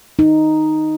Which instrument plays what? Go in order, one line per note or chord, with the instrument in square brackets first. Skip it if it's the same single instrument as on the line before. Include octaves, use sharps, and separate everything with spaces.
[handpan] D#4